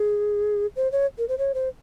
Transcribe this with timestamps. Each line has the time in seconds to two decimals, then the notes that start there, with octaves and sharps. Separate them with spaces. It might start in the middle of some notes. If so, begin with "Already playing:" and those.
Already playing: G#4
0.76 C5
0.92 C#5
1.18 A#4
1.29 C5
1.38 C#5
1.54 C5